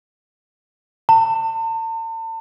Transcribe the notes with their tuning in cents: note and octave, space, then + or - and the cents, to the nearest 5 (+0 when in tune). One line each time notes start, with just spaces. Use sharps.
A5 +40